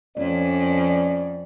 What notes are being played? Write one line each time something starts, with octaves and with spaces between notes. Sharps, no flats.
F2 C#4 D5